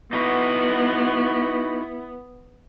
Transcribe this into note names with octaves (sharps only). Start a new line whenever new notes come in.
B3 D#4 E4 F#4 B4